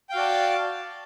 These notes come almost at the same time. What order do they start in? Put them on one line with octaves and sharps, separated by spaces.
G5 F5 F#4 D5 A5